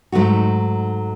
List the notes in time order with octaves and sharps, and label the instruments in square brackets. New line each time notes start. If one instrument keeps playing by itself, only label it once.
[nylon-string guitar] G#2 F#3 A3 D#4 F#4